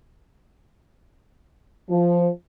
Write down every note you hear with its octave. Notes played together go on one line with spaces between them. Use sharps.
F3